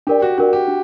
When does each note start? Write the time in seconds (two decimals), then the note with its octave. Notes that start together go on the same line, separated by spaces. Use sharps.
0.07 D4 G4 A#4 D5
0.22 F#4
0.38 D4 F#4 A#4 D5
0.53 G4
0.68 D4